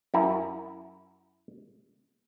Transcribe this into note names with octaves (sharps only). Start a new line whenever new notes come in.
F#2 E4 A#4